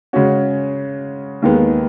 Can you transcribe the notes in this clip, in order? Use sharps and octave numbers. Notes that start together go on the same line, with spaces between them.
C#3 G#3 C#4 F#4
D#2 D#3 G#3 B3